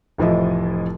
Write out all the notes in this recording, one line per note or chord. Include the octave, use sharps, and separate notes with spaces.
F1 A2 E3 F3 E4 D#5